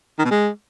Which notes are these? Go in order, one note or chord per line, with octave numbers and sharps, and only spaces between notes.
D#3
B2
G#3